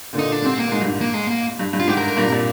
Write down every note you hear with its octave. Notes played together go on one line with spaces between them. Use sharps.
A#2 D3
D#4
D4
G#2 C3 C4
A#3
A#2
G#2 G#3
G2
G#2
A#3
G#3
A#3
G2
G2
F4
G#2 G4
A#4
A#4
G2 A#2
C3
A#2